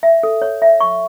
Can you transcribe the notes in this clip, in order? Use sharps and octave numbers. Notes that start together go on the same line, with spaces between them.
E5
A4
C#5
E5
C#6